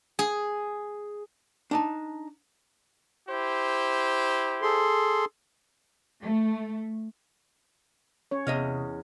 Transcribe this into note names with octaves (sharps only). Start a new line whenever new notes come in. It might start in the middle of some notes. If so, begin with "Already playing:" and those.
G#4
D4 D#4 A5
E4 G4 C5
G#4 A4 C6
A3
C#4 C#5
E2 C3 D#5 F5